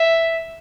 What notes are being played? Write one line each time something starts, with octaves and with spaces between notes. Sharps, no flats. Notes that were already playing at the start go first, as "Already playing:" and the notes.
Already playing: E5